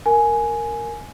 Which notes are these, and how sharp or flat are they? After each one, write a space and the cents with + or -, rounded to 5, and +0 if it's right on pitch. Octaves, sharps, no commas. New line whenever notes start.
A#4 -10 G#5 +10